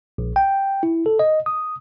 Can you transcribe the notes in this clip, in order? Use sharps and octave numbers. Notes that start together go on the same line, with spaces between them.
A#1
G5
E4
A4
D#5
D#6